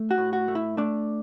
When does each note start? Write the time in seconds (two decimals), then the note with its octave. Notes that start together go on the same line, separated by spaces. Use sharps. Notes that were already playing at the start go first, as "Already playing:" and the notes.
Already playing: A3
0.11 F#4
0.18 A2
0.33 F#4
0.48 A3
0.55 E4
0.77 A3 D4